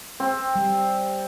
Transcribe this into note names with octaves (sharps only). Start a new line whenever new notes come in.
C4
G3